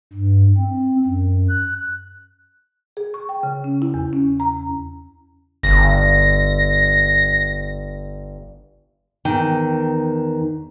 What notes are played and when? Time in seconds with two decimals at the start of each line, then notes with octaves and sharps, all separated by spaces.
0.13 G2
0.58 C4
1.05 F#2
1.49 F#6
2.97 G#4
3.14 C#6
3.29 G5
3.43 C#3
3.64 C#4
3.82 E4
3.94 E2
4.13 C#4
4.40 A#5
5.63 G1 A#6
9.25 E2 D#3 G5